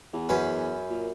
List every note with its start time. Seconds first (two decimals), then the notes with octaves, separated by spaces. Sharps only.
0.13 E2
0.29 F#2 C#4 B4
0.90 A#2